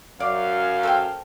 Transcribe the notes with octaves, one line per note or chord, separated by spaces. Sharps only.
F#2 D5 F5
A4 C5 G5